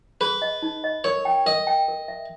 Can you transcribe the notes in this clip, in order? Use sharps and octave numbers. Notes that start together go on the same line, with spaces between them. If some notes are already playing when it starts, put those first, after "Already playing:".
G#4 B4
D#5
D#4
D#5
A#4 C#5
G5
A#4 D#5
G5
A#4
E5